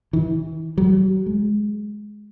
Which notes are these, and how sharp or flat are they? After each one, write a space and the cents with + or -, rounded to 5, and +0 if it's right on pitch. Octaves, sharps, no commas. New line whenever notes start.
E3 -35
F#3 +40
G#3 +10